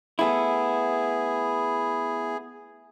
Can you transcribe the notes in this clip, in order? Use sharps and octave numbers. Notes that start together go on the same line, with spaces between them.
A3 B3 E4 G#4